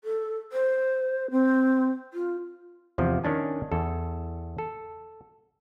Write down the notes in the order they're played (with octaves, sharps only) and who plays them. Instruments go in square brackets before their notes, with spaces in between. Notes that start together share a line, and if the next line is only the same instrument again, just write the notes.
[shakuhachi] A4
C5
C4
F4
[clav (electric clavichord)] E2 C3 F3
D#3 C#4 D4 G#5
E2 A4
A4